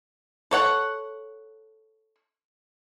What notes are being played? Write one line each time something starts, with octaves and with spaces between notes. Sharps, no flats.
A4 C#5 F#5